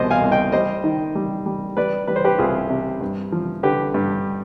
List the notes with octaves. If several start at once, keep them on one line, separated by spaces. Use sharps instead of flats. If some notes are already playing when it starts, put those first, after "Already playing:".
Already playing: C2 B2 C5 D#5
F5 G#5
C2
D#5 G5
G3 C5 D#5
D#3
G3
G3
G3 B4 D5
G3 B4
C5
G4 B4
C2 F4 G#4
C3
G2
F3
D3 G4 B4
G2